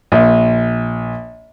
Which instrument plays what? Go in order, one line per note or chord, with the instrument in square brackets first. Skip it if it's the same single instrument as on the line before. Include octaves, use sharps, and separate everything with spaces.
[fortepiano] A#1